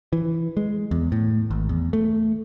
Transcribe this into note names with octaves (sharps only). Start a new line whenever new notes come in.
E3
G#3
E2
A2
G#1
E2
A3